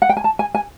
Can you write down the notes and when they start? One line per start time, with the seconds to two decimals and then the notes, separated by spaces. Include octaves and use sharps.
0.02 F#5
0.09 G5
0.17 G#5
0.24 A5
0.39 G#5
0.55 G#5